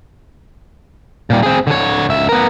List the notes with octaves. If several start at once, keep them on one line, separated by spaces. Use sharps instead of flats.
A#2 G3
C4 G#4
D3 C#5
C#2 E5
B3 A#4